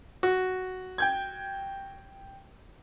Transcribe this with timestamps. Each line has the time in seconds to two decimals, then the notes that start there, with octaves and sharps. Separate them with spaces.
0.23 F#4
0.98 G5 G6 G#6